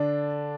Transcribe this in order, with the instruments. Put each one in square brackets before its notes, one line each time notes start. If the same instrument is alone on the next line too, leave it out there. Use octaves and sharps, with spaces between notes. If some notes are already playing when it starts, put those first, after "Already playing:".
Already playing: [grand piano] D3 D4